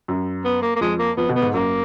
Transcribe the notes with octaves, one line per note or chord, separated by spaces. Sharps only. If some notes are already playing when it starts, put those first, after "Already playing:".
F#2
B3
A#3
A#3
F2 G#3
A#3
F2 B3
B2
B3
G#2
F#2 A#3